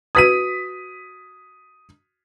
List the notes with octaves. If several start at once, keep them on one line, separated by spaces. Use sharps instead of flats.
F#4 B4 D#6 G#6 B6 D#7